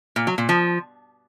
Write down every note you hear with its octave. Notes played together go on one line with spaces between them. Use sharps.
A#2
F#3
A#2
F3